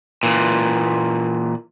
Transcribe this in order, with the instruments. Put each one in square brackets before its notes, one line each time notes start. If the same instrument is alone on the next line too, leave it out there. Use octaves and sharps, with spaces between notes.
[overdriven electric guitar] A#2 E3